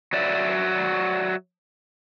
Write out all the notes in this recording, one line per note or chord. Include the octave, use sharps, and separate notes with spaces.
F#3 D5 E5